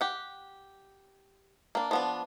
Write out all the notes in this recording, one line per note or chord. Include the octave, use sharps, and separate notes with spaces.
G4 F#5
A#3 D4
F3 B3 D4